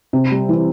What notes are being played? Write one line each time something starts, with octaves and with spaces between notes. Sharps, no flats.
C3
G3
E3